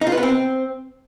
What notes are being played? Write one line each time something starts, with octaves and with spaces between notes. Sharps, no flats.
D#4
F4
B4
B3
C4